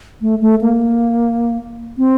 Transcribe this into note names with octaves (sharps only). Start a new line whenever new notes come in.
A3
A3
A#3
C4